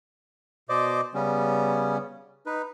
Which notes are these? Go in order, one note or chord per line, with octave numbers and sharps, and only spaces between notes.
B2 C5 D5 D#5 D6
C#3 G3 B3 C#4
D#4 B4